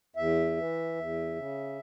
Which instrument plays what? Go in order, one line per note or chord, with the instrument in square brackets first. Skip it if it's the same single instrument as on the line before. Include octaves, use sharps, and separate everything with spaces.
[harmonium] E2 E5
E3
E2
C#3